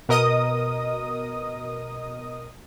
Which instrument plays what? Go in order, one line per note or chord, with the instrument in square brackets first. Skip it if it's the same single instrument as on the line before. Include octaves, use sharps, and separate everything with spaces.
[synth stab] B2 A#4 D#5 D#6